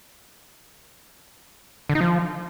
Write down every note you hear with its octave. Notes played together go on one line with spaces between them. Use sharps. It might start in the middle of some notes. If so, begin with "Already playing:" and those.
D3
D#4
F3